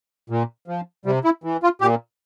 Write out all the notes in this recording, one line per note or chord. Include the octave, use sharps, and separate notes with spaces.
A#2
F3
C3 G3
E4
E3
F4
A#2 G4